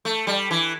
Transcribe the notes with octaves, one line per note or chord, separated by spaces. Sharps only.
A3
G3
E3